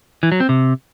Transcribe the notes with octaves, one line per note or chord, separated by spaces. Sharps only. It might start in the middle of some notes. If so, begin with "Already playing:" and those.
E3
F#3
C4
C3